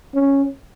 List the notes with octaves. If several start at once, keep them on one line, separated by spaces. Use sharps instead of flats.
C#4